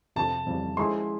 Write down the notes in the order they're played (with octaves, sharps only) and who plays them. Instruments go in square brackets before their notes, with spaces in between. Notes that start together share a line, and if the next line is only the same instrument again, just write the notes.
[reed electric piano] F2 C3 F3 [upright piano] A5
[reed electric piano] F2 C#3 E3 G3
[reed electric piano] F3 G#3 C#4 E4 G#4 [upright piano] C6